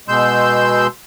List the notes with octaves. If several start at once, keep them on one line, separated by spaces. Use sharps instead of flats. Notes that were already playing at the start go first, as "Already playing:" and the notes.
B2 G#3 C6 E6 G6